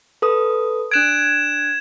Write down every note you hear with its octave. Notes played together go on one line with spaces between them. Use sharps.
A4 B4 D#6
D4 F#6 G#6 D7 E7